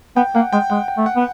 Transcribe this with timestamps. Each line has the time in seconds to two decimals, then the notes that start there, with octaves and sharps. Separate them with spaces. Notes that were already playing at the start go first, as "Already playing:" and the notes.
0.16 B3 G5
0.35 A#3 F#5
0.53 G#3 G5
0.70 G#3 F#5
0.88 G5
0.97 A3
1.06 F#5
1.16 B3